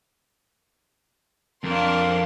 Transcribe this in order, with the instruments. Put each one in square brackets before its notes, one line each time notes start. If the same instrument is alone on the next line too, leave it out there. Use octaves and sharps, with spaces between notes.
[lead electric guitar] F2 [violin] D4 A#4 [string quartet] F5 A5 C6